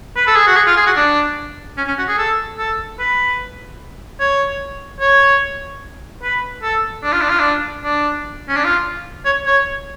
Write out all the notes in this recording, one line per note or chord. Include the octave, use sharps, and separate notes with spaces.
B4
A4
G#4
F#4
G#4
F4
G#4
F#4
D4
C#4
C#4
F#4
G#4
A4
A4
B4
C#5
C#5
B4
A4
D4
F4
D4
F4
D4
D4
C#4
D4
F4
C#5
C#5